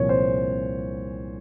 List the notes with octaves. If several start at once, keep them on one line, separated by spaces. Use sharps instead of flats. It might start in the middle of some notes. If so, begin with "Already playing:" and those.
Already playing: C2 A#2 F3 C#5
C5